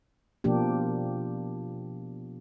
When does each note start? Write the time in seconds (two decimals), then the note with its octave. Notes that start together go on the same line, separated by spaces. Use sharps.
0.44 B2 F3 A#3 D4 G4